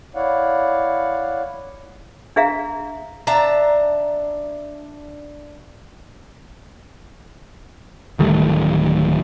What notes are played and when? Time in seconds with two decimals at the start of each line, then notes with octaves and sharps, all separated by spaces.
0.15 E4 C#5 D5 F5 F#5
2.36 D4 G#4 E5 F5 A#5
3.27 D4 E5 A5 A#5
8.19 D1 D#3 G3 A3